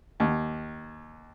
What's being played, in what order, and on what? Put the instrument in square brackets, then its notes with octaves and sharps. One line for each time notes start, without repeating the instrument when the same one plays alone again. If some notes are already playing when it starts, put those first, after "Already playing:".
[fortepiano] D#2